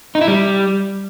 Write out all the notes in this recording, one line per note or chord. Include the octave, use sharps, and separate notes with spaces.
D#4
E4
G3